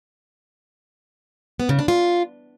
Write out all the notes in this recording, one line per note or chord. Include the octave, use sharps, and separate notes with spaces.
B3
C#3
D4
F4